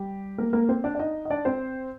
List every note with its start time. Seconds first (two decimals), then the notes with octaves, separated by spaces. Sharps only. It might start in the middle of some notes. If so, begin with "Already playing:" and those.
Already playing: G3 G4
0.38 A#3 A#4
0.53 A#3 A#4
0.69 C4 C5
0.84 D4 D5
0.95 D5
0.99 D#4 D#5
1.25 D#5
1.30 D4 D5
1.45 C4 C5